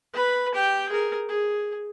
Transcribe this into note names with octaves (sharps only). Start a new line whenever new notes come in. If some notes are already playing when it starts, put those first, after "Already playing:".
B4 B5
G4 G5
G#4 A#4
G#4